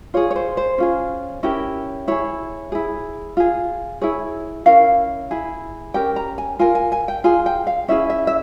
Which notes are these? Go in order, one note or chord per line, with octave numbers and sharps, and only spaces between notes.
F4 G#4 C#5
C#5
C5
C5
C#4 F4 G#4
C#4 E4 G4 A#4
E4 G#4 C#5
E4 G#4
F4 G#4
E4 G#4 C#5
C#4 E4 A#4 F5
E4 G#4
C#4 G4 A#4 G5
A#5
G#5
F4 A#4 G#5
G#5
G#5
G5
F4 G#4 G#5
G5
F5
C#4 E4 G#4 E5
E5
E5